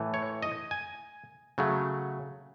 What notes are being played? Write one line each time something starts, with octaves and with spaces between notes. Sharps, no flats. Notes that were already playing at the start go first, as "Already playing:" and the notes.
Already playing: A2 E3 A3
C#5
D#5
G#5
C#3 F#3 A3